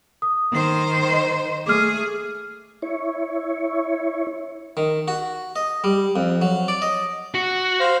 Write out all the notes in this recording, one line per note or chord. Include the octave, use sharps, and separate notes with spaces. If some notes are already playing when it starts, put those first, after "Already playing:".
D#6
D#3 C5
D#5
A3 G#4 D6 F6
E4 C#5
D#3
F#4
D#5
G3
F2
F#3
D5
D#5
F#4
C5 F5